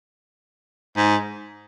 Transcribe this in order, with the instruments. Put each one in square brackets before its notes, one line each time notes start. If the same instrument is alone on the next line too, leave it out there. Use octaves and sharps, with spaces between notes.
[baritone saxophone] G#2